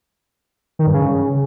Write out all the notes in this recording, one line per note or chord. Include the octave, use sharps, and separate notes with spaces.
D#3
G2
C#3